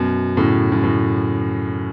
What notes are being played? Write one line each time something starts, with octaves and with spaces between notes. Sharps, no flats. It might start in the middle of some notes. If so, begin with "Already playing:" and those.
Already playing: F#2 B2
A2 C#3
F#2
A2